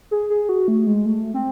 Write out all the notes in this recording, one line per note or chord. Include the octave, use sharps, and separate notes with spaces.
G#4
G#4
F#4
A3
G#3
A3
C4